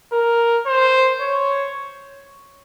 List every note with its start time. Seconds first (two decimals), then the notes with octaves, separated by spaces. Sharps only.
0.12 A#4
0.67 C5
1.21 C#5